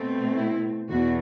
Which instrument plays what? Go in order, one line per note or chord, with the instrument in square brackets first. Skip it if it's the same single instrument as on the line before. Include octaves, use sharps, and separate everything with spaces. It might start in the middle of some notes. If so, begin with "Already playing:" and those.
Already playing: [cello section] B2 A3 C4
E4
E2 B2 F#4